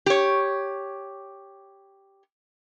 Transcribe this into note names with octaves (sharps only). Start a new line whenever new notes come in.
G4 C#5